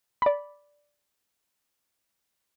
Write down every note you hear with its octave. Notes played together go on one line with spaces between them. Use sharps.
D5 B5